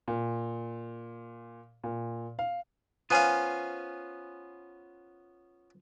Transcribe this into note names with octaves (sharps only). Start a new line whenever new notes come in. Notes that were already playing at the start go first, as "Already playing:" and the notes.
A#2
A#2
F5
B3 C#4 F4 C5 F5 G#5